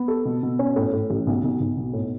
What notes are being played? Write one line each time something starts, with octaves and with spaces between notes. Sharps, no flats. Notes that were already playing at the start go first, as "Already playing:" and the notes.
Already playing: B3
A4
B2
B2
C#4
A2
A2
A1
B1
B1
B1
B2
A2